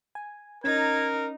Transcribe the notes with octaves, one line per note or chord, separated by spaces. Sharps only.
G#5
C#4 D#4 A#4 G#6